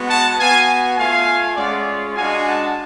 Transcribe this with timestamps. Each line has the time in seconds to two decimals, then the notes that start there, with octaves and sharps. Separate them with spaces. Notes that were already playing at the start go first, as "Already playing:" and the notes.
Already playing: G#3 B3 F#4
0.09 F#5 A5
0.39 B3 F#4 F5 G#5
0.98 A3 F4 F5 G#5
1.57 G#3 C#4 F4 D5 F#5
2.16 G#3 D4 F#4 F5 G#5
2.46 F#5 A5